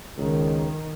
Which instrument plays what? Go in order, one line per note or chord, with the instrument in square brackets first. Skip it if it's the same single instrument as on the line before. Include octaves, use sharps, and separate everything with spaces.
[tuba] C#2 [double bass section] D#3